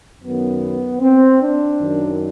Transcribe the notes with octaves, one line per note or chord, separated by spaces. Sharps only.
F#2 D#3 B3
C4
D4
F#2 D#3